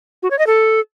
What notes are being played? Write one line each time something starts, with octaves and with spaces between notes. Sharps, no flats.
F#4
C#5
D#5
A4